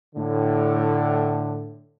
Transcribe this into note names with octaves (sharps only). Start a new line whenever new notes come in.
A2 D3